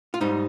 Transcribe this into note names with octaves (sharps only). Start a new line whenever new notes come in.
F4
G#2 G3 D#4